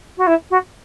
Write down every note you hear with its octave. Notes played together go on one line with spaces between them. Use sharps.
F#4
E4
F#4